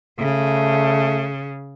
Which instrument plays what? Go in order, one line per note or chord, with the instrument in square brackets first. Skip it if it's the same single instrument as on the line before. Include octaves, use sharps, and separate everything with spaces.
[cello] C#3 [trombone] A3